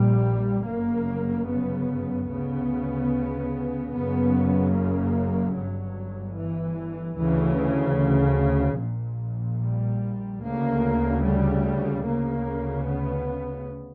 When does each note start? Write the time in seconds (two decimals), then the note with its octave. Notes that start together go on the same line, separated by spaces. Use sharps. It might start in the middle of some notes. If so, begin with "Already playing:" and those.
Already playing: A#1 A#2 G3
0.66 G1 F#2 C#3 A#3
1.48 B3
2.29 D2 C#3 B3
3.92 F#1 F#2 C#3 B3
4.73 A#3
5.55 G1 G2 F#3
6.36 E3
7.17 D2 C#3 E3
8.80 A#1 A#2
9.61 G3
10.43 D2 C#3 A#3
11.24 G3
12.05 D2 C#3 A#3
12.86 B3